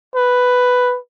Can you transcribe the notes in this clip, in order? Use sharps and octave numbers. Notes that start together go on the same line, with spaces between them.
B4